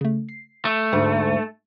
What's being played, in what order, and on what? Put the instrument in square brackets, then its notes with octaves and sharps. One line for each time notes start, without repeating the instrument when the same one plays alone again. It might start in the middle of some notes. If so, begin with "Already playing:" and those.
[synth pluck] C#3 A3
C7
[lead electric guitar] A3
[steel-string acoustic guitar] D2 G#2